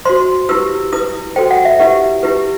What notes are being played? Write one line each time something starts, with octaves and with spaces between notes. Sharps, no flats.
F#4 C5 C6
E4 G4 B4 E6
E4 B4 D#6
F#4 A4 C5 G5
F#5
E5
E4 G4 B4 F#5
E4 G4 B4